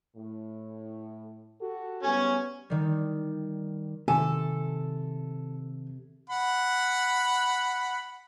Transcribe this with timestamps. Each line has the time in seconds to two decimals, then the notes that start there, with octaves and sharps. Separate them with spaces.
0.16 A2
1.60 F#4 G4 A4
2.04 G#2 G3 B3 C#4 G#5
2.70 D#3 G3
4.08 C3 D#3 A4 G#5
6.29 F#5 B5